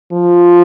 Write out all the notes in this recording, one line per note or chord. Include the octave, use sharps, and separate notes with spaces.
F3